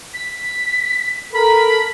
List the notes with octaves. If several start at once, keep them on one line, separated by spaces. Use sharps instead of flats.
B6
A4 A#4 B5